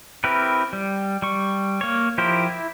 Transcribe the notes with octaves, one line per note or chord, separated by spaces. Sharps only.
C4 E4 G4 A#4 B4
G3
G3 C#6
A#3 C#5
F3 E4 G4 A#4 C5
E4